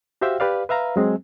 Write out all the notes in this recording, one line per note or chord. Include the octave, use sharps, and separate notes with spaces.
F#4 G4 C5 E5 F5 G5
G4 B4 D5 F5
B4 E5 F5 A#5
F#3 G#3 C4